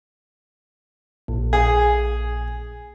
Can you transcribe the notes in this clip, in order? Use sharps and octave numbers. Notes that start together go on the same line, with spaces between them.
A#1 A#2
G#4